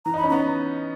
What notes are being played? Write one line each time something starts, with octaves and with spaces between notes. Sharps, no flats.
E3 A#5
D#4 B5
C#4
B3 A#5